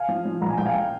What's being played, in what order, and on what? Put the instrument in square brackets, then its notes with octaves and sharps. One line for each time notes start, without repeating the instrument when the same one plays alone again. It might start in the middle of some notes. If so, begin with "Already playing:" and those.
Already playing: [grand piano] F5 G#5
[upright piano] F3
F3
[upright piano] A#1 [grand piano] A#5
[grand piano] G#5
[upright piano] A#1 [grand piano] G5
[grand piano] F5 G#5